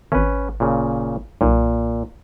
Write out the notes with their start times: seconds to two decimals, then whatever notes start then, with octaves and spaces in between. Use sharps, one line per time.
0.12 G#1 C#4 B4
0.60 A#2 C#3
1.41 B1 A#2